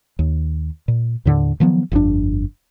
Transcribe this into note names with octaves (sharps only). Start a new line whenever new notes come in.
D#2
A#2
D#2 A2 D3
D#3 F3 F#3 B3
G1 F2 D3 D4